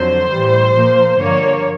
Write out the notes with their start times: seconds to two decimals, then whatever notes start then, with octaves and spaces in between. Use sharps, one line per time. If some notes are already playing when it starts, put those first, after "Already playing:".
Already playing: F2 D3 F#3 C5
0.29 A2 E3 G3
0.74 A#2 F3 A#3
1.18 G2 D3 F3 A#3 C#5